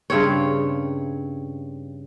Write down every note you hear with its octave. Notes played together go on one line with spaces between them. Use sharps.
G2 C#3 C4 C#5